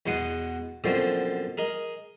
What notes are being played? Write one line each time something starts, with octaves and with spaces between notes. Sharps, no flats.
E2 B2 G#3 F#5 D#6
F#2 B2 D3 F3 G#3 C4
G#4 A#4 D#5